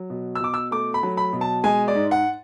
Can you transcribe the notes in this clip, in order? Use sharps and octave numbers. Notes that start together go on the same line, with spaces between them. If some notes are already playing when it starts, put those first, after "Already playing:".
Already playing: F#3
B2
E6
B2 D6
E6
A3 D6
B5
F#3
B5
B2
A5
G#3 G#5
D5
G#2
F#5